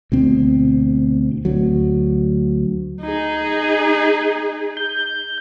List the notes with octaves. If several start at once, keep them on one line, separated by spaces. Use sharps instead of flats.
D2 B2 C4
D2 F#3
D#4 G#4
G6